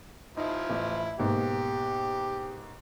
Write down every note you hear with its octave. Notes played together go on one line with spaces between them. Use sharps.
F3 D#4 E4
A1
G#2 B2 A#3 G4